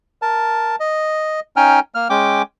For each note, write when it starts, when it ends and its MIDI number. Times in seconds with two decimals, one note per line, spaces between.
0.22 0.76 70
0.22 0.76 81
0.80 1.40 75
1.56 1.80 61
1.56 1.80 63
1.56 1.80 79
1.56 1.80 80
1.56 1.80 89
1.95 2.08 58
1.95 2.08 89
2.10 2.42 56
2.10 2.42 61
2.10 2.42 79
2.10 2.42 86